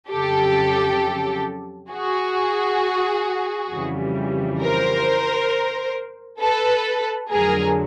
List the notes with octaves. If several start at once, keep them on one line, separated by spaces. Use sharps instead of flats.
F2 C#3 F#3 G4 A4
F#4 G#4
F2 C#3 E3 G3
A#4 C5
A4 B4
F2 D3 F#3 A3 G#4 A#4